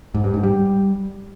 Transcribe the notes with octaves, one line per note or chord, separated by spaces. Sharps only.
G#2
G2
G#2
G3